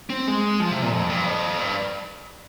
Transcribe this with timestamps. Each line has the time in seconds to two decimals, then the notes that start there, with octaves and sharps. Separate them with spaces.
0.10 C4
0.27 G#3
0.60 F3
0.71 C3
0.82 A#2
0.92 F2
1.10 G2
1.25 F2
1.58 G2